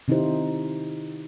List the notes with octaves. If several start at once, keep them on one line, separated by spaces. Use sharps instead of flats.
C3 D#3 D#4 E4 G4 C5